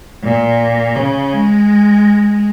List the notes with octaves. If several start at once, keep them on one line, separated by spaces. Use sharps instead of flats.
A#2
C#3
G#3